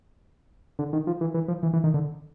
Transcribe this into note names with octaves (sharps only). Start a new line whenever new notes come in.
D3
D#3
F3
E3
E3
F3
E3
E3
D#3
D3